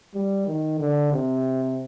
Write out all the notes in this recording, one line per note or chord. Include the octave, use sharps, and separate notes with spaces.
G3
D#3
D3
C3